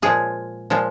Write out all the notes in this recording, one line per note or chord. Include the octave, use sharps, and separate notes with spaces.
A#2 F3 G#3 F4 G#4
A#2 F3 G#3 F4